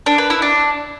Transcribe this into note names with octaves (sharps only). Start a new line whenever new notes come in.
D4
B4
E4
D4